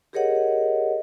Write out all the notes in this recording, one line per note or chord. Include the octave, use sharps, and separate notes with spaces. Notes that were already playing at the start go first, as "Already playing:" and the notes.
G4 G#4 A#4 C#5 D#5 F#5